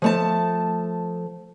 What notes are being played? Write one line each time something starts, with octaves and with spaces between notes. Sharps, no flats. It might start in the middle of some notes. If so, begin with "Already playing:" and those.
F3 A3 A5